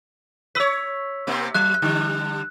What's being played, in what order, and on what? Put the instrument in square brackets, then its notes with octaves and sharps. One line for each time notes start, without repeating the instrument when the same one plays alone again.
[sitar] B4 C#5 [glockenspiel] E6 B6
[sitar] C3 A#3 C4
[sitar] F#3 [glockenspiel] F#6
[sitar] D3 G3